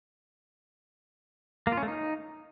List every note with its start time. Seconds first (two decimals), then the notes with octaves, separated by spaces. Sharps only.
1.67 A#3
1.72 F4
1.77 C#4
1.83 A3
1.88 D#4